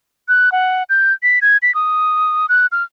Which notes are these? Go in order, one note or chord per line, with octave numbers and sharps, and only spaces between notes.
F#6
F#5
G6
B6
G#6
B6
D#6
F#6
F6